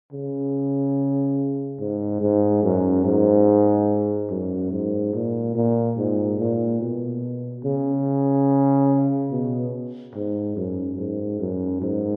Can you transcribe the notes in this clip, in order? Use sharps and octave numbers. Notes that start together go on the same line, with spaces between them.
C#3
G#2
G#2
F#2
G#2
F#2
G#2
A#2
A#2
G#2
A#2
B2
C#3
B2
G#2
F#2
G#2
F#2
G#2